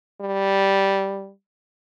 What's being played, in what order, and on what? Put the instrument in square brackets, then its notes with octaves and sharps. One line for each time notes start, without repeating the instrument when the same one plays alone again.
[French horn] G3